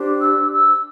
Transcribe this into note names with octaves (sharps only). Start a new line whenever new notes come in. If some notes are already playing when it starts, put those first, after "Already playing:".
Already playing: D4 G4 C5
E6
E6